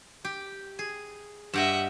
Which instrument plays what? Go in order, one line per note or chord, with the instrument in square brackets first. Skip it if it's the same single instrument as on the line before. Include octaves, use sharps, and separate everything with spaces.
[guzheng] G4
G#4
[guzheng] G2 G4 D#5 [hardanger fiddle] E5 F#5